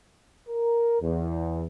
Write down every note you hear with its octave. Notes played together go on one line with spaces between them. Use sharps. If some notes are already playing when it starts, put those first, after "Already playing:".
A#4
E2